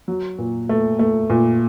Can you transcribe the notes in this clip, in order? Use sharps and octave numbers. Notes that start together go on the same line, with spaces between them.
F#3
A#2
A3
A3
A#2